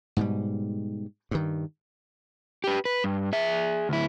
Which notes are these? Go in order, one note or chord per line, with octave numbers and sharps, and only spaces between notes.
G#2 B2 G3
G2 D#3
G4 B4
B4
G2
G#4 E5
D2 E4